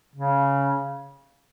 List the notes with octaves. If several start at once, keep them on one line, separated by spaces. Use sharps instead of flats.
C#3